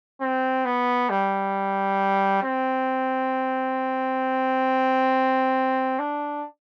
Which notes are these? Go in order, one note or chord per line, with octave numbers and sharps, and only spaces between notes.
C4
B3
G3
C4
D4